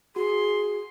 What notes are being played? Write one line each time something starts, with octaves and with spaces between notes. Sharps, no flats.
F#4 G#4 C6